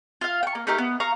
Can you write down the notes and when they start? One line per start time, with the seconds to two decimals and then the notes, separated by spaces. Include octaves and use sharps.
0.21 F4 F5
0.43 G5 C#6
0.55 A#3
0.67 A3 D#4 G4 A#4
0.78 B3
1.00 F5 A#5 C#6